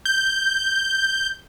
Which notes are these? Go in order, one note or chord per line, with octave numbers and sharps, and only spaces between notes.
G6